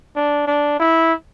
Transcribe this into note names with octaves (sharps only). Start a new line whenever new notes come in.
D4
D4
E4